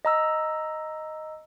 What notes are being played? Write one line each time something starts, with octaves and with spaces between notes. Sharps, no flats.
D#5 A#5 E6